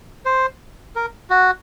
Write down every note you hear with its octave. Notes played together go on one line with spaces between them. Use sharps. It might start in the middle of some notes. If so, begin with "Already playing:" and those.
C5
A#4
F#4